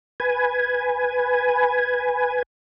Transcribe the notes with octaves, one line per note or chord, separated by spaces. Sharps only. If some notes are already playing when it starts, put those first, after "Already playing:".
B4 G#5